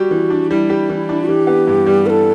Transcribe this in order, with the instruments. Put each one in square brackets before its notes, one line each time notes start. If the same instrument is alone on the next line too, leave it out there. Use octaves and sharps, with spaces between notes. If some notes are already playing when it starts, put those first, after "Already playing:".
Already playing: [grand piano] G3 G4 [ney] F#4
[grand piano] E3
D4
[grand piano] G3 [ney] E4
[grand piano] G4
E3
D4
[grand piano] E3 [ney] G4
[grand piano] B3
G2
G3
[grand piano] E3 [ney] B4
[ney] A4